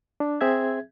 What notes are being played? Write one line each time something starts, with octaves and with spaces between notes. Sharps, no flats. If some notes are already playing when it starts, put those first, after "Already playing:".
D4
C4 G#4 E5 G#6